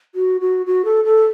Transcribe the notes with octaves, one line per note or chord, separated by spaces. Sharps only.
F#4
F#4
F#4
A4
A4